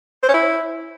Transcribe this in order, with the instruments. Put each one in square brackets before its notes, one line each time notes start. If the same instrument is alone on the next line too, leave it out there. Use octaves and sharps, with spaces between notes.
[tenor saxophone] C5
C#4
E4